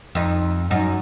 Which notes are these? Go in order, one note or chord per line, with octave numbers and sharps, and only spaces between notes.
F2 D#4
F#2 D#4